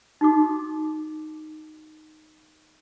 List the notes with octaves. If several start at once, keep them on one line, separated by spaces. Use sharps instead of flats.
D#4 F#4 D6